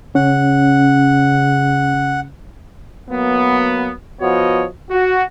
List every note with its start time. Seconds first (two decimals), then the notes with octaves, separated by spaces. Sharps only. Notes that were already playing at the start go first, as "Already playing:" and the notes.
0.15 C#3 C#4 F#5
3.10 F#3 A#3 B3
4.21 F3 B3 F#4 C#5 D#5
4.90 F#4